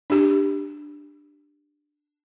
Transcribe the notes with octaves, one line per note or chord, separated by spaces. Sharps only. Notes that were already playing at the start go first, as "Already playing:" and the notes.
D4 G4